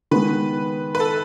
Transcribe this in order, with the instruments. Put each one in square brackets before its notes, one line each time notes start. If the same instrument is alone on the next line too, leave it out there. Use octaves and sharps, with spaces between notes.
[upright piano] D#3 G#3 B3 [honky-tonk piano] B4
[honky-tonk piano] B4
A4